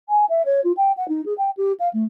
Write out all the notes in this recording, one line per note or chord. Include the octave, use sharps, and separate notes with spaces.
G#5
E5
C#5
F4
G5
F#5
D#4
G#4
G5
G4
F5
A3